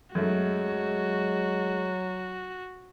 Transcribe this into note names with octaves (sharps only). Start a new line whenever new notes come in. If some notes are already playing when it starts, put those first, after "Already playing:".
F#2 F#3 G#3 A3 F#4